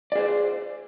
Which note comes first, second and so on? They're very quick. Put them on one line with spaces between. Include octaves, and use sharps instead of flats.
D5 G#4 C5